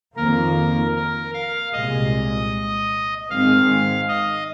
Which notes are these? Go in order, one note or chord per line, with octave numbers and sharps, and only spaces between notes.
F2 D#3 A#3 A#4
A#4
F5
C2 A#2 G#3 D#5
G#2 D#3 G#3 C4 F5
D#5